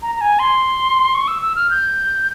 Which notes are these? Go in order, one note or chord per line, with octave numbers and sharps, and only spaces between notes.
A#5
A#5
G#5
C6
C#6
E6
E6
F6
G6